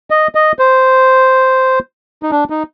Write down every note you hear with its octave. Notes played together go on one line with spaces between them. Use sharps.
D#5
D#5
C5
D#4
D4
D#4